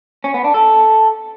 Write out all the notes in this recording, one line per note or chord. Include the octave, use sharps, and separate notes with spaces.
C#4
B3
D4
A4